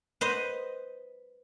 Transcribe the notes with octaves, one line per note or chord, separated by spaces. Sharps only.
B4 C5 D#5